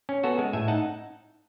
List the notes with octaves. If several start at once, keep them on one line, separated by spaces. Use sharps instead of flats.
C#4
B3 F#4 A4
G#3
A2 E5 G#5
D#4 F#5 A5